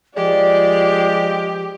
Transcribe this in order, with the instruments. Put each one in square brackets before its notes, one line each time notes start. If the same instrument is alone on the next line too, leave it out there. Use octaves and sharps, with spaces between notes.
[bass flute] F3 [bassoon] G#3 [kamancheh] G4 [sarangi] D5